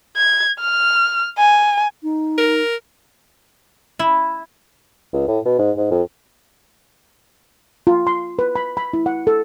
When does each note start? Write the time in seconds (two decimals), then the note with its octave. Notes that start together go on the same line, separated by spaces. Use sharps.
0.17 G#6
0.60 F6
1.38 G#5
2.03 D#4
2.38 A#4
3.99 E4
5.13 C#2
5.28 A2
5.45 B2
5.59 G#2
5.77 G#2
5.91 F2
7.87 F4
8.07 C6
8.39 B4
8.56 B5
8.77 B5
8.93 E4
9.06 F#5
9.27 A4